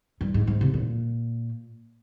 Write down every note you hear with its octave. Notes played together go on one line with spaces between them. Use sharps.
G2
G#2
G#2
C3
A#2